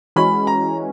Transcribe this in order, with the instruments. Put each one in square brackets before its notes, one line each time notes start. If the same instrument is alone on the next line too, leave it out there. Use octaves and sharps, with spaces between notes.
[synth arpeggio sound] E3 G#3 C#4 F#4 [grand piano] B5
[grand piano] A#5